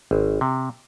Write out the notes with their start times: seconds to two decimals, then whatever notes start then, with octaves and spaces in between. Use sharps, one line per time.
0.11 G#1
0.41 C3